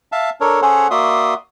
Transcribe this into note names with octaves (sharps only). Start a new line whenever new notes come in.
E5 F5 A5
D4 A4 A#4 C#5
C#4 G#4 A4 C5 C#5 F#5
A#3 F#4 D5 E5 C6 D#6